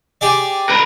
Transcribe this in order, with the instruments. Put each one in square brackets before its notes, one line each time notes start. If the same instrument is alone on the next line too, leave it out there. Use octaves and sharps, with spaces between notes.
[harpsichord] G4 G#4 D5
[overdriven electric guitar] A#4 B4